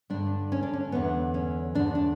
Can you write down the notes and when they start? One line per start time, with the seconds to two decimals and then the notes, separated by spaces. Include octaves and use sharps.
0.10 G2 D3 D4
0.52 C#4
0.63 D4
0.73 C#4
0.92 E2 D3 B3
1.34 C#4
1.75 E2 D3 D4
1.95 D4